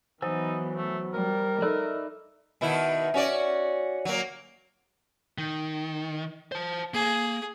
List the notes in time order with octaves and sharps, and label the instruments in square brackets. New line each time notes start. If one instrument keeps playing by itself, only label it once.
[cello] E3 B3 [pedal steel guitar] F#3 G#5 E6 [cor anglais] D#4 [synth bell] C5
[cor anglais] A3
[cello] G3 [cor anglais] A#4
[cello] D#4 [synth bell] A4 B5 E6 [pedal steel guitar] D5 E5
[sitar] B2 D#3 E4
C#4 F#4 D5
F#3 A#3
[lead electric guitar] D#3
C5 A5
[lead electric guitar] A#3 [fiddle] G#4